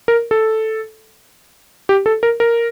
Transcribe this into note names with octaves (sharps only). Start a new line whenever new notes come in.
A#4
A4
G4
A4
A#4
A#4